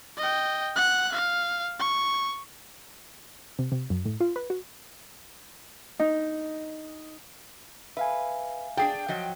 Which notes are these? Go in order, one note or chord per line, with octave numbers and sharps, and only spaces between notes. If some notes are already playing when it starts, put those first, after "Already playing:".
D#5 G5
F#5 F#6
F5
C#6
C3
C3
F#2
A2
F4
B4
F#4
D#4
B4 E5 F5 G#5
D4 G#4 D5 G5
F3 F#3 D#5